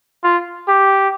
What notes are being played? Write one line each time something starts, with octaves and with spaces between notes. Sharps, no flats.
F4
G4